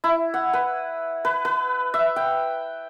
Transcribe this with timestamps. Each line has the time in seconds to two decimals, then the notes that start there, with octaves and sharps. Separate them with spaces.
0.04 E4
0.34 F#5
0.53 B4
1.25 B4
1.45 B4
1.94 E5
2.16 G5